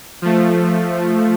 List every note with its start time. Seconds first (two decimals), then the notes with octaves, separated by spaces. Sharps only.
0.22 F3 A3